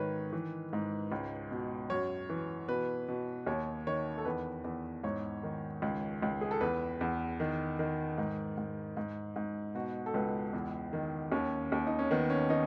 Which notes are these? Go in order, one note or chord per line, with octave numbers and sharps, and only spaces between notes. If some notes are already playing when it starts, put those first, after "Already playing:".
Already playing: G#2 D#3 B4 C#5
E3
G#2
C#2
B2
F#2 C#5
E3
B2 B4
B2
D#2 C#5
D#3 C#5
A4
E2 B4
E2
G#2 C#5
D#3
C#2
C#2
G#4
A4
E2 B4
E2
D#3
D#3
G#2
G#2
G#2
G#2
B2 F#4
A4
C#2 B4
E2
D#3
D#2 C#4
D#2
D#4
C#4
D#3 B3
C#4
D#3 D#4